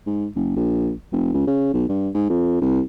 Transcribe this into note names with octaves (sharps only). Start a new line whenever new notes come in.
G#2
F#1
A#1
F1
C#2
C#3
B1
G2
G#2
F2
C2